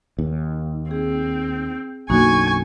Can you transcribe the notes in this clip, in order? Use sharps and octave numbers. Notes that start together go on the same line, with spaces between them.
D#2
C4 G#4
B1 F#2 D3 A#3 D#4 F#4 G#5 C#6